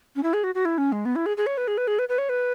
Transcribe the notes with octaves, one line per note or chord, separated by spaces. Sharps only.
C#4
E4
G#4
F#4
F#4
E4
C#4
G#3
B3
E4
G#4
G#4
C#5
B4
G#4
B4
G#4
B4
B4
C#5
B4